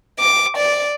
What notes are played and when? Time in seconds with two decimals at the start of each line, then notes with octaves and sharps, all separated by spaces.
0.20 D6
0.57 D5